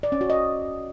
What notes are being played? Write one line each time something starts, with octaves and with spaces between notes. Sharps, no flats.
D5
C#4
F#4
D#5